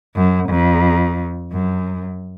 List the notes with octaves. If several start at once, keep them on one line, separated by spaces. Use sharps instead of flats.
F#2
F2
F#2